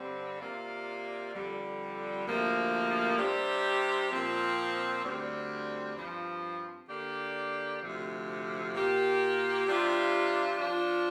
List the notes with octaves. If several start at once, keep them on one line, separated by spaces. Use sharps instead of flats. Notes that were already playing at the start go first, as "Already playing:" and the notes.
Already playing: G2 D3 G3 C4
C3 A#3 F4 D5
F2 D3 G3
D2 C3 F3 A#3
C3 G3 D4 G4 C5
A#2 F3 C4
D2 D3 G3 C4
G2 F3 C4
D3 A#3 G4 D5
D2 C3 F3
A#2 A#3 G4
C3 G3 D4 F4
F3 D4 F4